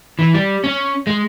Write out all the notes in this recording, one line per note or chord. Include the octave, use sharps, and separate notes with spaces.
E3
G3
C#4
G#3